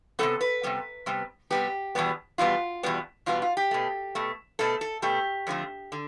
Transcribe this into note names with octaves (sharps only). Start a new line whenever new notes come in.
C3 G3 B3 A4
B4
C3 G3 B3
C3 G3 B3
C3 G3 B3 G4
E2 B2 G3 B3
E2 B2 G3 B3 F4
E2 B2 G3 B3
E2 B2 G3 B3 F4
F4
G4
B2 A3
B2 A3
B2 A3 A4
A4
B2 A3 G4
F2 D3 F3 A3
D3